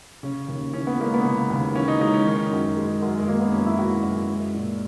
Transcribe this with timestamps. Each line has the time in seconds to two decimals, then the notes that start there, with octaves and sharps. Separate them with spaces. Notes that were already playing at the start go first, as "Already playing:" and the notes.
0.23 C#3 C#4
0.48 D#2
0.73 E3 C#4
0.87 B3
0.99 G#3 A#3
1.14 B3
1.25 C#3
1.50 D#2
1.75 E3 C#4
1.88 D#4
2.01 G#3 D#4
2.14 C#4
2.26 D#3
2.52 F#2
2.77 G#3
3.02 F#2
3.20 G#3
3.28 D#3 A#3
3.40 B3
3.53 F#2 C#4
3.66 E4
3.79 G#3 F#4
4.03 F#2
4.30 G#3
4.55 A#2